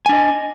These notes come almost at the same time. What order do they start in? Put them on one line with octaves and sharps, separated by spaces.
G#5 D4 D#5